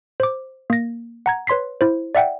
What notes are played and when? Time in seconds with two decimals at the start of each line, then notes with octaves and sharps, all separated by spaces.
0.20 C5 D6
0.70 A#3 A#6
1.26 F#5 A#5 G#6
1.47 B4 C#5 C6 B6 C7
1.81 E4 C5
2.15 D5 E5 F#5 G5